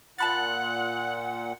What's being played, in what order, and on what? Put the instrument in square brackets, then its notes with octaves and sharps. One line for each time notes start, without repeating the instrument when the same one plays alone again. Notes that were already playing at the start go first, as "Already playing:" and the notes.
[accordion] A#2 F#5 [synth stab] A5 B5 A6 [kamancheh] F#6